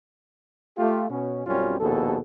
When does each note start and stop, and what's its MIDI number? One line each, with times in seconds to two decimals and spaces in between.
0.78 1.07 57
0.78 1.07 65
0.78 1.07 67
1.10 1.44 47
1.10 1.44 61
1.47 1.78 35
1.47 1.78 42
1.47 1.78 55
1.47 1.78 60
1.47 1.78 61
1.47 1.78 65
1.80 2.18 34
1.80 2.18 39
1.80 2.18 47
1.80 2.18 68
1.80 2.18 69